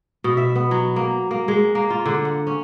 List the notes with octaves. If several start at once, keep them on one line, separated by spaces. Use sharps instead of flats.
B2
E5
B3
F#3
A#3
A#3
G#3
A#3
F4
D3
F#5
C#4